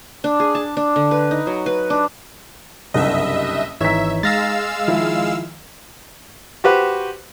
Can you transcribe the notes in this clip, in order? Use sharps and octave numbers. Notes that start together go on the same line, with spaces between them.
D4
G#4
A5
D4
D3
B4
D#4
F#3
B4
D4
F#1 C2 G2 D#5 E5
G#1 E3 D#4 C#5 E5 A#5 B6
G#3 F5 E6 A6 A#6
D#3 F3 E4
F#4 G4 B4 C5